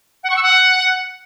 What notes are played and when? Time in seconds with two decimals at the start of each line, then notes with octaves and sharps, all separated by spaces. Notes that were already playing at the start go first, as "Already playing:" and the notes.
0.24 F#5
0.30 C#6
0.36 E6
0.43 F#5